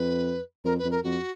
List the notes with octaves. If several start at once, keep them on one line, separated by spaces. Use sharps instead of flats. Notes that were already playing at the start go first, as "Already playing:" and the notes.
Already playing: F2 B4
F2 A#4
B4
F2
A#4
F2 F#4